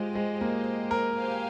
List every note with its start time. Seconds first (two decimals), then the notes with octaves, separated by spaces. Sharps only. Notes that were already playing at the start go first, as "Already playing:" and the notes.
Already playing: G#3 F4 G4 C5 D#5
0.15 G#3
0.41 A#3
0.91 A#4
1.17 G4 C5 F5 G#5